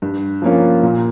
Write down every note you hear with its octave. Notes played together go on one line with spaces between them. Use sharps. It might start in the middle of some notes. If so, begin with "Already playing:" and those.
G2
F3 A#3 C#4 F4
A#2